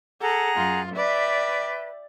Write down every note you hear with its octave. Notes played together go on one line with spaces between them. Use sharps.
G#4 A4 F#5 A#5
F#2 F4
B4 D5 E5 G5